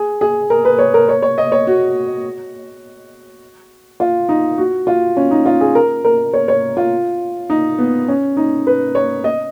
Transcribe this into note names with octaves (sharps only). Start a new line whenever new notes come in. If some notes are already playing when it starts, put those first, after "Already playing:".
Already playing: G#4
G#4
A#4
B4
C#5
A#4
C#5
C#5
D#5
C#5
F#4
F4
D#4
F#4
F4
C#4
D#4
F4
G#4
A#4
A#4
C#5
C#5
F4
D#4
B3
C#4
D#4
B4
C#5
D#5